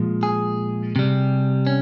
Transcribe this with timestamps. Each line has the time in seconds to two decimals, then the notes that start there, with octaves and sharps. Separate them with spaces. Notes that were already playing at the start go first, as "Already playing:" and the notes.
Already playing: A#2 F3 G#3
0.23 G#4
0.96 C3 G3
1.67 C#4